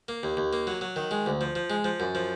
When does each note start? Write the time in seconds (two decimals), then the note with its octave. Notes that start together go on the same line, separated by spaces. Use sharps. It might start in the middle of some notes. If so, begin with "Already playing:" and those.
0.08 A#3
0.23 D#2
0.37 D#2
0.53 A#3
0.67 F#3
0.81 F#3
0.96 D#3
1.11 G#3
1.26 D2
1.41 F3
1.55 F3
1.70 G#3
1.84 F3
2.00 F#2
2.15 F3